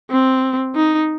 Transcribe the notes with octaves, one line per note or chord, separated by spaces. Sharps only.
C4
D#4